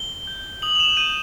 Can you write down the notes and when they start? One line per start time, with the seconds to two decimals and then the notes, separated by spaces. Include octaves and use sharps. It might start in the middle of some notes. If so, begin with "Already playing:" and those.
Already playing: G7
0.27 G6
0.62 D#6 F#7
0.75 F7
0.80 E7
0.97 G6 D#7